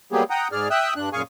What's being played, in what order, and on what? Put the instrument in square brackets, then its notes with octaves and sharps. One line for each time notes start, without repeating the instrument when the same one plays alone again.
[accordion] F#3 G3 A#3 B3 G4 G#4
F#5 G5 A#5 D#6
G#2 G#4 D5 F6
E5 G5 D#6 E6 F#6
G2 D4 F#6
F#2 A#2 G#4 F5 G#5 C#6